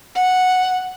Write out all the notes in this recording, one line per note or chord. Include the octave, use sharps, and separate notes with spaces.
F#5